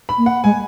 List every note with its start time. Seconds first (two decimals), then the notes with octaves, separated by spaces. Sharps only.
0.09 B5
0.18 A#3
0.26 F#5
0.44 G#3 G#5